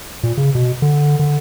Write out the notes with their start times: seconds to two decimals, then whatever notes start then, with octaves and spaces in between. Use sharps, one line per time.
0.23 A#2
0.37 C#3
0.55 B2
0.82 D3
1.19 D3